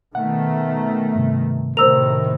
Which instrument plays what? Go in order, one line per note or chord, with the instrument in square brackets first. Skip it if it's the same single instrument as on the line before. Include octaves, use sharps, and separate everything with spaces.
[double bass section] B2 D#3 A3 [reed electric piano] F#5
[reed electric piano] G2 C3
[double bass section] A2 C3 D#3 [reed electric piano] A#4 [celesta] C5 E6 F7